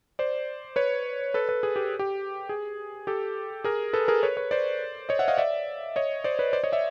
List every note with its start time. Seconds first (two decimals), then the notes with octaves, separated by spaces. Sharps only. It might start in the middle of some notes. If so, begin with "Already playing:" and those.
0.19 C5 D5
0.76 B4 C#5
1.34 A4 B4
1.49 A4 B4
1.63 G#4
1.76 G4
1.99 G4
2.49 G#4
3.07 G4 A4
3.64 G#4 A#4
3.93 A4 B4
4.08 G#4 A#4
4.23 B4 C#5
4.37 B4 C#5
4.51 C5 D5
5.09 C#5 D#5
5.19 E5 F#5
5.28 D#5 F5
5.37 D5 E5
5.96 C#5 D#5
6.24 C5 D5
6.39 B4 C#5
6.53 C5 D5
6.64 C#5 D#5
6.72 D5 E5